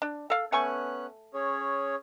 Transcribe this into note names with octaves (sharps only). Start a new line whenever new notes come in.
D4
A4 F5
A3 B3 C#4 G#5 C#6 F#6
C#4 G#4 C#5